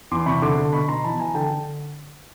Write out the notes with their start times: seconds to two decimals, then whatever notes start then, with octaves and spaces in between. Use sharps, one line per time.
0.11 E2 C6 D6
0.26 C3 B5 C#6
0.42 D3 C6 D6
0.58 D3
0.73 B2 B5 C#6
0.88 B2 A#5 C6
1.03 E3 A5 B5
1.19 E3 G#5 A#5
1.34 D3 G5 A5
1.50 D3